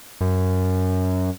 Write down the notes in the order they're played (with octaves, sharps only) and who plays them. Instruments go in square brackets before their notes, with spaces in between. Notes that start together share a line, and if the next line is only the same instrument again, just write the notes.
[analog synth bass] F#2